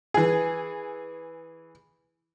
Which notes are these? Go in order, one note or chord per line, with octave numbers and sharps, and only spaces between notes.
E3 G#4